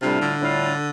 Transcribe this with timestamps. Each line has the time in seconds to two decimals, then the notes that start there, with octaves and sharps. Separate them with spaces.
0.01 A2 C3 G3 D4 F4
0.21 D3
0.41 A2 G3 D4 F4